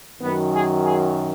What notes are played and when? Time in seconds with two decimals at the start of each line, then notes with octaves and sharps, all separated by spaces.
0.21 F#2 D#3 F#3 B3
0.53 G#4
0.84 G#4